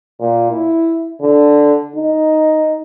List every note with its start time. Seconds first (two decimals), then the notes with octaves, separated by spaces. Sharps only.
0.20 A#2
0.51 E4
1.21 D3
1.96 D#4